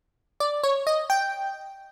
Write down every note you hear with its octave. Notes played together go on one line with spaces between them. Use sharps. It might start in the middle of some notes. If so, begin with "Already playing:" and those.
D5
C#5
D#5
G5